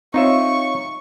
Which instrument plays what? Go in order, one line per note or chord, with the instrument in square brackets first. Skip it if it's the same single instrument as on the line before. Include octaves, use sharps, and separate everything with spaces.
[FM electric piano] C4 C#5 [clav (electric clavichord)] D#4 F4 E5 [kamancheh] C#6